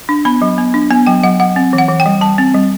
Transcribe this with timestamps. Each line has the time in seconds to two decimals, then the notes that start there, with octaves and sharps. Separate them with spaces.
0.09 D4
0.25 B3 B5
0.42 F#3
0.58 B3
0.74 D4
0.90 B3 G#5
1.07 F#3 G5
1.23 F#3 F#5
1.40 F#3 F#5
1.56 C4
1.73 E3
1.78 F#5
1.88 E3
2.00 G5
2.06 G3
2.21 G3 A5
2.38 C4
2.55 G3